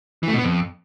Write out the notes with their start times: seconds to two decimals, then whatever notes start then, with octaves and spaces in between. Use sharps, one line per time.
0.23 E3
0.28 A3
0.33 B2
0.38 B3
0.44 F2